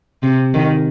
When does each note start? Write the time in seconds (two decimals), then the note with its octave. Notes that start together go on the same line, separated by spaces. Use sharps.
0.23 C3
0.54 D#3